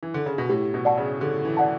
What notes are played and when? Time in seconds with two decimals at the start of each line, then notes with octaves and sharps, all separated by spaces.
0.03 E3
0.14 D3
0.26 C#3
0.38 B2
0.49 A2 G4
0.74 B2
0.85 D5 F#5 A5
0.97 C#3
1.21 D3 G4
1.45 E3
1.57 D5 F#5 A5